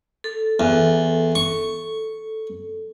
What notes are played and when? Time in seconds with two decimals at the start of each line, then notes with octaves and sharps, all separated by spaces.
0.24 A4
0.60 E2
1.35 C#6